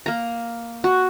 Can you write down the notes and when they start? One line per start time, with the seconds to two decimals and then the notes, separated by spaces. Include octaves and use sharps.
0.06 A#3 A#5
0.84 F#4